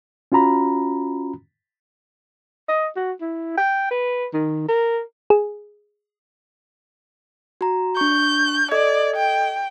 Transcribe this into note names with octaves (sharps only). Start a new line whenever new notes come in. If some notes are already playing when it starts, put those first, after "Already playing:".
C#4 F4 F#4 A#5 B5
D#5
F#4
E4
G5
B4
D#3
A#4
G#4
F#4 A#5
D4 C#6 G6
A4 D5 D#5 G#6
G5